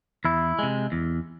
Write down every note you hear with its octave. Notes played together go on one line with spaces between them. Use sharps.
E2 E4
C3 G#3
E2